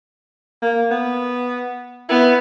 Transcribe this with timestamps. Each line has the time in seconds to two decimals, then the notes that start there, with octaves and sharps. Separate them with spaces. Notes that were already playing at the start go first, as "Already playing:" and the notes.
0.62 A#3
0.91 B3
2.09 B3 E4